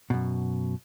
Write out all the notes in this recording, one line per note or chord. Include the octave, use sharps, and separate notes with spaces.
F#2 B2